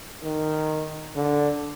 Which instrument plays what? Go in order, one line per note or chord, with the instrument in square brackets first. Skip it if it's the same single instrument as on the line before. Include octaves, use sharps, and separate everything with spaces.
[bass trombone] D#3
D3